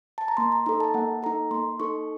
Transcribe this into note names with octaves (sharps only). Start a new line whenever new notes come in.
A5
A#5
A#3 C6
A#5
D#4 A4 A#5
A5
A#3 F#5
D#4 A4 A#5
A#3 C6
D#4 A4 C#6